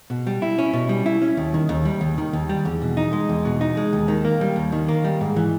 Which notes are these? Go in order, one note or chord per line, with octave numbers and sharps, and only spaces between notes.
B2
G3
E4
C#4
B2
G3
E4
C#4
D#2
D#3
D#2
G3
D#2
D#3
D#2
G3
E2
B2
D#4
G#3
E2
B2
D#4
G#3
D#2
D#3
A#3
G3
D#2
D#3
A#3
G3
G#2
E3